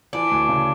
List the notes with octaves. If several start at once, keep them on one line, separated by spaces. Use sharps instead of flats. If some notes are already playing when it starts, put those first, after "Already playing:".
E3 D4
D2
C#3